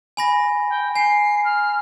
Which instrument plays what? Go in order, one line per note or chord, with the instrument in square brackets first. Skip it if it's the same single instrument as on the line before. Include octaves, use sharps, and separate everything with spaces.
[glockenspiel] G#5 B5 A#6
[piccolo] G5
[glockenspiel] G#5 [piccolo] C7
[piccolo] F6